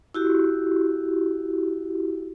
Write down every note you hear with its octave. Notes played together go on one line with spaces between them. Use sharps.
E4 F#4 G4